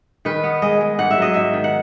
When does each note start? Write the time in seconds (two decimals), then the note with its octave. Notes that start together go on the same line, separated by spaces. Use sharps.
0.25 D#3 B4
0.44 B3
0.62 G#3 D#5
0.81 G#3
0.98 G#2 F#5
1.11 E5
1.17 F#3 D#5
1.34 G#2 E5
1.53 D#3
1.64 F#5